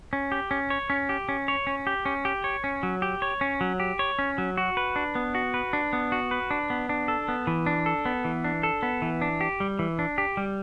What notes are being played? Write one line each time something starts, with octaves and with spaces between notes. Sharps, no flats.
C#4
G4
C#4
C#5
C#4
G4
C#4
C#5
C#4
G4
C#4
G4
C#5
C#4
F#3
G4
C#5
C#4
F#3
G4
C#5
C#4
F#3
F#4
B4
D4
B3
F#4
B4
D4
B3
F#4
B4
D4
B3
D4
A4
B3
E3
D4
A4
B3
E3
D4
A4
B3
E3
D4
G4
G3
E3
D4
G4
G3